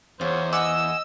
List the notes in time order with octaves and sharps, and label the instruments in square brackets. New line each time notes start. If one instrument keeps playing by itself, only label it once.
[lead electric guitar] E2 [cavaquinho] F4 [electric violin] C5 C#5
[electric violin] D#5 [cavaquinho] F#5 G#5 D6 [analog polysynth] E6